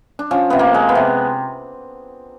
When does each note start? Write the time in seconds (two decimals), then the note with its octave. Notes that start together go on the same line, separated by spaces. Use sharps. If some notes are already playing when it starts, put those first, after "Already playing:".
0.19 D4
0.31 F3 C#4
0.50 C3 B3
0.59 A#3
0.74 G#3
0.89 B3
0.95 C3